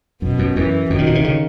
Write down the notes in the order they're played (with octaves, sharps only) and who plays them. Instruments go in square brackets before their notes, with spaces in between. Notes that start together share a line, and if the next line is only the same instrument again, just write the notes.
[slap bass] F#2 [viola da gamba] B2
[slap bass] F#2
[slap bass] F#2 [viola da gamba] E3
[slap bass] F#2 [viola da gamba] D#3
[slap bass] A#2
B2
C3
C#3